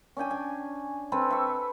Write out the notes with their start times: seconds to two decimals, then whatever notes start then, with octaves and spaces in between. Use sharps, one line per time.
0.17 C#4 D4 G5 G#5
0.31 G#5
1.12 C4 A4 B4 E5
1.30 E5 C#6